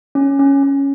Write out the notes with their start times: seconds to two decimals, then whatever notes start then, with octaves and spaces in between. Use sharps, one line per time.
0.15 C#4
0.39 C#4
0.63 C#4